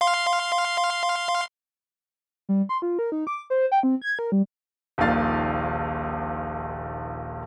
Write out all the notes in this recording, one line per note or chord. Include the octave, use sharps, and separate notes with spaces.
F5 C6
G3
C6
F4
A#4
D#4
D6
C5
G5
C4
G#6
A#4
G3
D#1 A#1 A#2 D#3 F5 A6